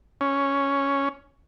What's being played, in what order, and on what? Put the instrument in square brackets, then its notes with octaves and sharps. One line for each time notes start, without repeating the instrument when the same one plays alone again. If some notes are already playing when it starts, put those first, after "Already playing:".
[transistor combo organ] C#4